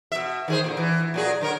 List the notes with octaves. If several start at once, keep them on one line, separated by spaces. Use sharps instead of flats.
B2 E5
D#3 G#4 C5
A#2 D3
E3
A#2 F#3 G#4
D3 A#4 C#5